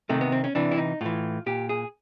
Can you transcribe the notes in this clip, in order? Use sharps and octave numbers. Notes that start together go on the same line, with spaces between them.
C3 D#3 A3
B3
C4
C#4
C3 E3 D4
E4
D#4
A2 E3 F4
A#2 G4
G#4